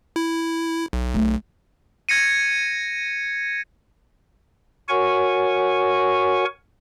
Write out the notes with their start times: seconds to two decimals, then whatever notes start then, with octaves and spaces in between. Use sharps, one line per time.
0.16 E4
0.93 B1
1.14 A3
2.09 G#6 A#6 C#7 D#7
4.89 F#4 A#4 C#5 F#5 G#5 C#6